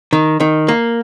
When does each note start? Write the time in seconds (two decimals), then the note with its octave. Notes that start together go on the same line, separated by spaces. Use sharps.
0.13 D#3
0.40 D#3
0.68 A#3